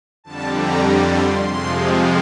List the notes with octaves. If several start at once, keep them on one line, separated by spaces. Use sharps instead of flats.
F2 D3 G3 A5
A#5
C6
F2 C3 F3 G#3 C6